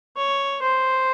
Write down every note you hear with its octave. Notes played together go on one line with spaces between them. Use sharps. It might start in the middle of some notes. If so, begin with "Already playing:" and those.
C#5
C5